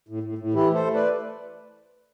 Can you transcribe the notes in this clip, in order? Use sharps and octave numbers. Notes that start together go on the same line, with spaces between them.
A2
A2
A2
E3 E4 G4
A3
A4 C5
A3
B4 D5